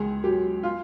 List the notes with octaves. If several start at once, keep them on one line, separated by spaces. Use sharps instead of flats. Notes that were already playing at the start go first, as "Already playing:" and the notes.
Already playing: C#2 G#4
F#3 G4
F4